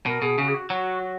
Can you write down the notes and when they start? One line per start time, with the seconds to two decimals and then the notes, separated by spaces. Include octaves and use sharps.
0.06 B2 A#4
0.22 B2 G#4
0.38 C#3 F#4
0.48 G#4
0.54 F#4
0.70 F#3 F#4
1.03 F#4